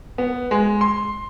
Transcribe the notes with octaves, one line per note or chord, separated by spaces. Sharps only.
B3
G#3
C6